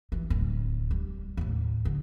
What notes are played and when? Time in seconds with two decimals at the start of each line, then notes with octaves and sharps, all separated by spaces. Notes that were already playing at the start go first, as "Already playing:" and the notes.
0.12 E3
0.30 D1
0.91 G3
1.37 D#2 A2
1.85 D3